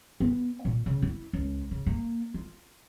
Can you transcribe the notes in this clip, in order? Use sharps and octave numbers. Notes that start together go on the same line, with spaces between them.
B3
A#2
C#3
E4
C#2
C#3
A#3
F4